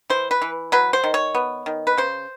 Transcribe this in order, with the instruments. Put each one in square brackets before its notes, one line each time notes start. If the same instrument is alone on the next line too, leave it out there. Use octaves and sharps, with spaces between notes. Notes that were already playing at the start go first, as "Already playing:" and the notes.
[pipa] E3 C5
B4
E3
F#3 B4
C5
D#3
C#5
B3
D#3
B4
C#3 C5